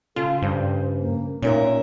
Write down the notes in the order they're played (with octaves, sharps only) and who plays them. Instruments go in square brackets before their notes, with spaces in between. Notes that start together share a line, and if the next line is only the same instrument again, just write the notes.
[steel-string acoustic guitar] C#3 [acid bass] F4 [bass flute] A4
[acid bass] G2 [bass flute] C5
[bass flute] A#3
[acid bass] A#2 [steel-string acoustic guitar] C#4 A#4 E5 [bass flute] D#4